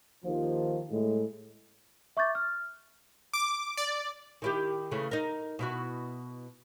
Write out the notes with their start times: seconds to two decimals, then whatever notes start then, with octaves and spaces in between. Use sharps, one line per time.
0.24 D#2 D#3 F3
0.91 A2 G#3
2.17 E5 C#6 D6 G6 A6
2.35 F6
3.34 D6
3.77 D5
4.42 D#3 E4 G4
4.91 C#3 E3 A3
5.11 D#4 A#4
5.59 B2 E4 F#4